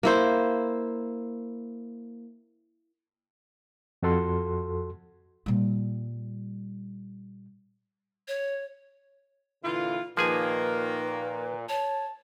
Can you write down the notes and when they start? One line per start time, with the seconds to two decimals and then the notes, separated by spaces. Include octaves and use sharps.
0.03 A#3 E4 C5
4.03 F2 F#4 A4 C6
5.46 A#2 G3
8.28 C#5
9.64 A#2 D3 E3 F4
10.17 A#2 D#3 F3 A#3 G#4 B4 G#5
11.69 C#5 A5